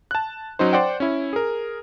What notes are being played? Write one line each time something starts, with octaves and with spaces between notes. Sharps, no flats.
A5 F#6
F#3 C#4 D#4 C5
C5 D5 F#5 G5
C#4 E4
G#4 A#4